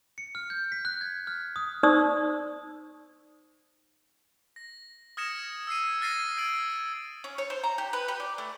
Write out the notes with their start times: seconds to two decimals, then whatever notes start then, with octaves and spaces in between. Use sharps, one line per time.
0.18 C#7
0.35 F6
0.50 G6
0.72 B6
0.85 F#6
1.01 G#6
1.27 F6
1.56 D#6
1.83 D#4 C5 D5 C#6 D#6 E6
4.56 A#6
5.17 D#6 F6 G#6 A#6 C#7 E7
5.67 E6 G#6 C7 D#7
6.01 F6 A6 A#6 C7 D#7
6.37 E6 G#6 D7 F#7
7.24 C#4
7.38 C#5
7.50 C5
7.63 A#5
7.78 G4
7.93 B4
8.08 G4
8.20 D5
8.38 A3